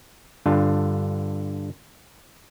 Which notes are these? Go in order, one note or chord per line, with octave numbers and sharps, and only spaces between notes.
G2 D3 F4